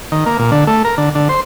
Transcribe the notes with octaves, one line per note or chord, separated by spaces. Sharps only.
D#3
A#3
A#2
D3
A3
A#4
D3
D3
C5